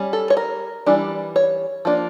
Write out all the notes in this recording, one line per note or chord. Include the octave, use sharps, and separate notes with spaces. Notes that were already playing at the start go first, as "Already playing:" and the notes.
Already playing: G3 C#4
A4
C#5
A#4
E3 G3 D4
C#5
F3 A#3 D4